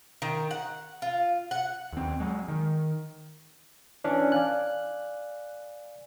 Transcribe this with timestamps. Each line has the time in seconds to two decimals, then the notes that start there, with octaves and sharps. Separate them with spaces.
0.22 D#3
0.51 F#5
1.02 F4
1.51 F#5
1.93 D#2 C4
2.20 F#3 G#3
2.48 D#3
4.04 E3 C#4 D4
4.32 D5 F5 G#5 F#6